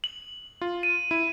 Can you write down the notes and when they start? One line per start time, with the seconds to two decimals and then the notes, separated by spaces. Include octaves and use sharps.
0.04 F#7
0.61 F4
0.83 D#7
1.11 E4